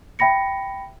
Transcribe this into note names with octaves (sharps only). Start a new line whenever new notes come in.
E5 G5 B5 A#6 C#7